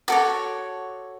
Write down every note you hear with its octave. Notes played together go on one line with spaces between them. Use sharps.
F#4 A4 C#5 D6